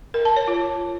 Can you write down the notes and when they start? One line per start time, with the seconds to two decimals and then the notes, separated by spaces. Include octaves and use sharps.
0.14 A#4
0.25 A5
0.36 C#5
0.48 F4